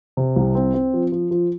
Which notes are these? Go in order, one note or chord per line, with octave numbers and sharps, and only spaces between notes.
C3
C2
C4
C4
F3
F3
F3